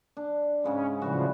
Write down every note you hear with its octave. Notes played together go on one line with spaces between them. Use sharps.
D4
G#2 C#3 G#3 C#4
A2 C#3 E3 F3 G3 F#4